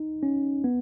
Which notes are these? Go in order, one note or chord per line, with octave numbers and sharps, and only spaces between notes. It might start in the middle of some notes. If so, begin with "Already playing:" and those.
Already playing: D#4
C#4
B3